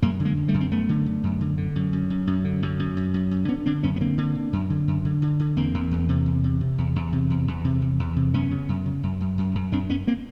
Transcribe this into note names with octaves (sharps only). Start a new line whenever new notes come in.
F#2 G#3 A#3
D3
G#3 A#3
F#2
G3 A3
F#2
C4
F#2 A3 B3
D3
D3
F#2
D3
D3
F#2
F#2
F#2
F#2
D3
F#2
F#2
F#2
F#2
F#2
D3 B3 C#4
D3 C4 D4
F#2 B3 C#4
B3
D3 A#3 C4
D3
D3
F#2
D3
F#2
D3
D3
D3
E2 A#3 C4
E2
E2
C3
E2
C3
C3
E2
E2
C3
E2
E2
C3
E2
E2
C3
F#2 B3 C#4
C#3
F#2
C#3
F#2
F#2
F#2
F#2
F#2 C4 D4
F#2 B3 C#4
A#3 C4